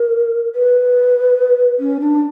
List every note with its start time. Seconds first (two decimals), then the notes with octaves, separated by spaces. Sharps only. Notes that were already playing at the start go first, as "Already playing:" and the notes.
Already playing: A#4
0.55 B4
1.79 C#4
2.00 D4